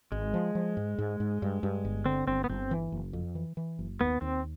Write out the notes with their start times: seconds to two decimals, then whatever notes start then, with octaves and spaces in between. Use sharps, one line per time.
0.12 G#1 G#3
0.34 F3
0.55 F3
0.77 G#2
0.98 G#2
1.20 G#2
1.42 G2
1.63 G2
1.85 G1
2.06 D3 C4
2.28 G1 C4
2.44 B3
2.49 G1 C4
2.71 E3
2.92 F#1
3.13 F2
3.35 E3
3.57 E3
3.79 F#1
4.00 D#2 B3
4.21 D#2 C4